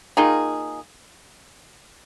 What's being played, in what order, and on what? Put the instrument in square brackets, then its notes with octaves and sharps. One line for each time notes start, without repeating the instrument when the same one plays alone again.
[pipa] D#3 A#3 D#4 F4 G#4